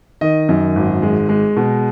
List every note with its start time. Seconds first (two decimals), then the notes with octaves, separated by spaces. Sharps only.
0.21 D#3 D#5
0.49 F#2
0.76 G#1
1.02 G#3
1.29 G#3
1.56 B2